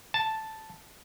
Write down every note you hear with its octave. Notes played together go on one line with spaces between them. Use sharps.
A5